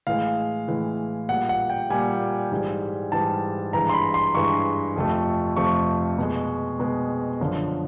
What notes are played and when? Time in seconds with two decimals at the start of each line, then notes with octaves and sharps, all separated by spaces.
0.07 A2 E3 G#3 F5
0.68 A2 E3 G#3
1.29 A#2 G3 F#5
1.49 F#5
1.70 G5
1.90 A#2 G3 G#5
2.52 G#2 E3 G3
3.12 G#2 E3 G3 A5
3.73 G2 E3 G#3 A#5
3.89 C6
3.94 B5
4.14 C6
4.35 G2 E3 G#3 C#6
4.96 F2 C3 F3 A3
5.57 F2 C3 F3 A3 C#6
6.18 B2 G#3
6.79 B2 G#3
7.40 F#2 D3 F3